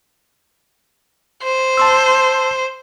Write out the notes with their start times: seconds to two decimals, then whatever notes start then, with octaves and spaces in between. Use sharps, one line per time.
1.43 C5
1.77 A5 C6 E6